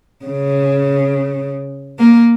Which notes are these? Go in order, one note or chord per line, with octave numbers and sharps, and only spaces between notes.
C#3
A#3